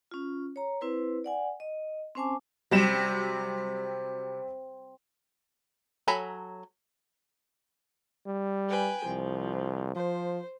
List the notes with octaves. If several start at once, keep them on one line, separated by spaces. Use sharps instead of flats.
C#4 F4
C#5 A#5
C4 E4 B4 C5
D5 F#5 G#5
D#5
C4 C#4 C5 G#5 A5 D6
C3 F#3 G3 E7
F#3 A4 G#5 A#5 B5
G3
B4 G5 G#5
C2 F3
F3 C5